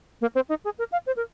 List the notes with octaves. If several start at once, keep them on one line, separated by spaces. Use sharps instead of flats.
A#3
C4
D#4
G#4
A#4
F5
C5
A#4